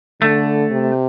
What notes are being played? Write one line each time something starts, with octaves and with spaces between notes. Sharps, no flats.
D3 A3
C3